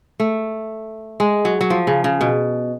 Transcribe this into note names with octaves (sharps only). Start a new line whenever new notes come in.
A3
G#3
F#3
F#3
F3
C#3
C#3
B2